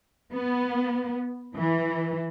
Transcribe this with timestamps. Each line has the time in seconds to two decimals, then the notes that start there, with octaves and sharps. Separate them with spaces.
0.34 B3
1.55 E3